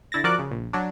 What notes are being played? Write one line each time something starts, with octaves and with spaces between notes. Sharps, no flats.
D3 E4 A6 A#6
F3 F#4 A#4 D5 D6 F#6
C#3
A#1
F#3 D4